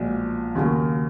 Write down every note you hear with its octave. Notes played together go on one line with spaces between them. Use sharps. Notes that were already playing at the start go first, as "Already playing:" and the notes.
Already playing: B1 A#2 F3 G#3
D#2 C#3 F#3 A#3